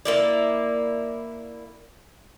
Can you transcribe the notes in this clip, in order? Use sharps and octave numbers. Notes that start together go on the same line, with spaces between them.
A#3 E4 D5